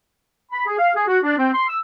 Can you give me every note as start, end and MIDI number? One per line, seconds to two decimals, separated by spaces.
0.52 0.65 83
0.67 0.79 68
0.79 0.91 77
0.95 1.06 68
1.07 1.19 66
1.23 1.36 62
1.37 1.49 60
1.54 1.64 84
1.68 1.78 88